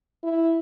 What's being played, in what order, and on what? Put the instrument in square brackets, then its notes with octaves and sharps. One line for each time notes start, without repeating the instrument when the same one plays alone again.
[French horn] E4